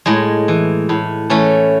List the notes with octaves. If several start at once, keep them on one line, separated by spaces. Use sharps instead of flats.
A2 G#3
E3
A2
E3 A3 C#4